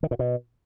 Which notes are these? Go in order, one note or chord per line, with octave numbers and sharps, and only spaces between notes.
D#3
A#2
B2